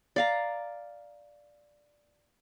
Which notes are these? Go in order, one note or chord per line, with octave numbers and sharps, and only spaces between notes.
D5 F5 A#5